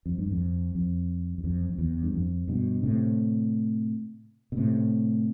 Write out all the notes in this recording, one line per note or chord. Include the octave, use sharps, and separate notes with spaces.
F2
G2
F2
F2
E2
F2
F2
E2
G2
F2
G2 B2
A2 C3
B2
A2 C3